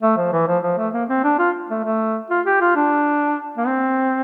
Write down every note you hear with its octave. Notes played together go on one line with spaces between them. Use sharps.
A3
F3
E3
F3
F3
A3
A#3
C4
D4
F4
A3
A3
F4
G4
F4
D4
A#3
C4